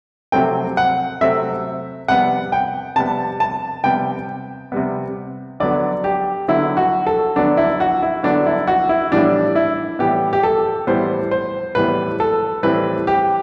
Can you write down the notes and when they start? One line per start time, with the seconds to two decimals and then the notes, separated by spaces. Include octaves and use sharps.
0.32 C3 F#3 A3 C4 G5
0.77 F#5
1.21 C3 F#3 A3 C4 E5
2.08 C3 G3 B3 F#5
2.52 G5
2.96 C3 G3 B3 A5
3.40 A5
3.84 C3 G3 B3 G5
4.72 C3 G3 B3
5.60 D3 F#3 B3 D5
6.04 G4
6.48 D3 F#3 B3 E4
6.77 F#4
7.07 A4
7.36 D3 F#3 B3 D4
7.57 E4
7.80 F#4
8.03 E4
8.23 D3 F#3 B3 D4
8.46 E4
8.67 F#4
8.89 E4
9.12 A2 E3 G3 B3 D4
9.55 E4
9.99 A2 E3 G3 B3 G4
10.33 G4
10.43 A4
10.87 A2 E3 G3 B3 C5
11.31 C5
11.75 A2 E3 G3 B3 B4
12.20 A4
12.63 A2 E3 G3 C4 B4
13.07 G4